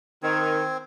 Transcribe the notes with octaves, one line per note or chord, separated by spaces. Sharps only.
D#3 C4 G#6